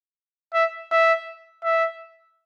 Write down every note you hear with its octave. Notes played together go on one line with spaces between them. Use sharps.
E5
E5
E5